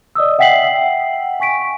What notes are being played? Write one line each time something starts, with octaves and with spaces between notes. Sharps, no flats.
D5 D#5 D#6 E6
E5 F#5 G5 B6 C7 F#7
G#5 C#6 B6 D7